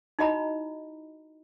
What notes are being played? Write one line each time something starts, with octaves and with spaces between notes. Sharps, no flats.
D#4 E4 F#4 D#5 A#5 B5